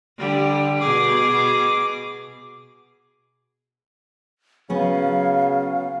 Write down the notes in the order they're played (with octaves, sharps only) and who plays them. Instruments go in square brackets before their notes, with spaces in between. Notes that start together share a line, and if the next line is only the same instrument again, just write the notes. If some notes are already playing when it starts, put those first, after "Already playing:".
[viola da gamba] D3 G3 G4
[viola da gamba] B2 G#4 [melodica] D6
[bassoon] C#3 [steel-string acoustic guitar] F#3 B3 C#4 [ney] F5